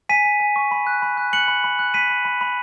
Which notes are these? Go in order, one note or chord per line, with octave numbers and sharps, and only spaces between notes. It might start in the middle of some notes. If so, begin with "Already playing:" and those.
G#5 B6 D#7
G#5
G#5
C#6
B5
F#6
B5
F#6
F#6 C#7 F#7
B5
B5
F#6
B5 B6 D#7
B5
B5
B5